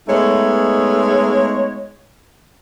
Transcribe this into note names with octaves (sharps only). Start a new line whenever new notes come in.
G#3 A3 B3 D#4 C#5